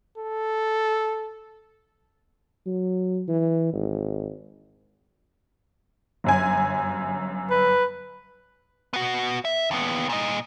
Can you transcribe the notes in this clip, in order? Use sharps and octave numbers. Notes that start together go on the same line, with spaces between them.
A4
F#3
E3
G#1
G1 F#2 G#5
B4
B3 F#4
E5
D#2 B3
A#2 D#5